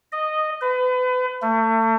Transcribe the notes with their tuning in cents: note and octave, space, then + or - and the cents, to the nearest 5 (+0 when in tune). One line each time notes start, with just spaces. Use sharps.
D#5 -10
B4 +35
A3 +35